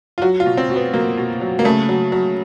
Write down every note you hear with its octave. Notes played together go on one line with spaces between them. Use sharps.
F4
F#3 F#4
F4
B2
C4
B2
B3
F#3 A#3
B2
F#3
A#3
C#3 A3
F#3
F#3